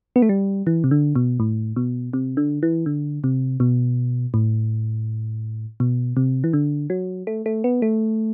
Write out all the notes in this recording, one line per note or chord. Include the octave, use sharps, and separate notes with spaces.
B3
A3
G3
E3
C3
D3
B2
A2
B2
C3
D3
E3
D3
C3
B2
A2
B2
C3
E3
D3
F#3
A3
A3
B3
A3